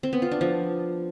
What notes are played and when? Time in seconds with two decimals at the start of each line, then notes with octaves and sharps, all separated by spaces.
0.03 C4
0.13 B3
0.22 F4
0.31 D4
0.41 F3